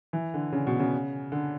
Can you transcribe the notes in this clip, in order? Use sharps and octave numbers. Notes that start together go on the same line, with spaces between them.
E3
D3
C#3
B2
C#3
D3